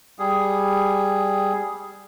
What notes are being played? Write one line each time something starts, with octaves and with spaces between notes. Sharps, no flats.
G3 G#4